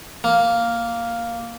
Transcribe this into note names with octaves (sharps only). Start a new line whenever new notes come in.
A#3